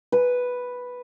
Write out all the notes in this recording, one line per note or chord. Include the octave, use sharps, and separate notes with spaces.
B4